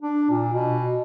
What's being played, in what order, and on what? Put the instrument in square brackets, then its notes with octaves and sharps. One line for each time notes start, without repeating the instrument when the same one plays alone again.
[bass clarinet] D4
A#2
B2